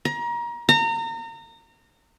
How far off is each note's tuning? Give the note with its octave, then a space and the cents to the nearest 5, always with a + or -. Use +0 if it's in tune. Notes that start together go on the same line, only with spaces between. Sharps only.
A#5 +30
A#5 -30